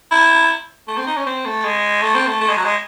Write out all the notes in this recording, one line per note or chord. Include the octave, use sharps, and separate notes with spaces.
E4
A3
C4
D#4
C#4
C4
A3
G#3
A3
C4
A3
A3
G#3
F#3
G#3